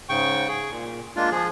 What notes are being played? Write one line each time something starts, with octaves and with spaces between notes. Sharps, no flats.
G#2 C#3 G5 C#6
G#4
A#2
G#3 A#3 D4 F4
F3 G#4